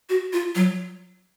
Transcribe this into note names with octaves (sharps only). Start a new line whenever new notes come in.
F#4
F4
F#3